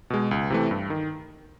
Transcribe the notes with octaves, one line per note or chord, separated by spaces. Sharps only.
B2 G#3
C#2
C3 E3 A3
G2
D#3